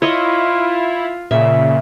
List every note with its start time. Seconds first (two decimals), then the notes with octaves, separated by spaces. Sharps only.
0.02 E4 F4 C#5 D#5
1.31 A#2 C#3 E5